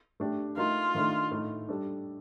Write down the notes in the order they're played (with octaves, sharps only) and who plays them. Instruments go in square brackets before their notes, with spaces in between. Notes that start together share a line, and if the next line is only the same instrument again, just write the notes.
[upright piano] A3 D4 G4
[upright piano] A3 D#4 A#4 [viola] F4
[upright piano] D#3 A3 D4 A4
A2 A3 D#4
G3 D4 A4